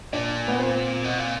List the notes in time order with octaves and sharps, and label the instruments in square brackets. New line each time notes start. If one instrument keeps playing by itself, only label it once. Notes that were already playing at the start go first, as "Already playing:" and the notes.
[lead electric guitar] A#2 [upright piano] D4
[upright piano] B3
C4
[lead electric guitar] B2
A#2